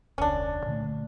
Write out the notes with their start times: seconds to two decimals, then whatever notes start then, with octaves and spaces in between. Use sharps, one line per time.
0.18 E1 C#2 C#4 D4
0.66 A#2 D3 A3